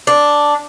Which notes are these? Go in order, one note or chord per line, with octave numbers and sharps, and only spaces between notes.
D4